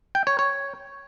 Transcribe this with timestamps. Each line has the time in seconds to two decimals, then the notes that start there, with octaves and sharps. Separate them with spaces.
0.15 G5
0.27 C#5
0.39 C#5